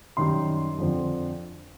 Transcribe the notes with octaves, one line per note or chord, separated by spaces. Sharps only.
F#2 D#3 G3 C6
F2 D3 F3